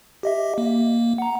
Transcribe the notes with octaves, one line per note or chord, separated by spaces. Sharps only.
G4 D#5 E5
A#3
F#5 A#5